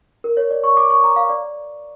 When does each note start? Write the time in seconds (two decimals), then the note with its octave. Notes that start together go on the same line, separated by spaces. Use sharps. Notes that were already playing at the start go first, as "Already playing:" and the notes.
0.24 A#4
0.37 C#5
0.51 D5
0.64 C#6
0.77 D6
0.90 C#6
1.04 A#5
1.16 F5
1.29 D5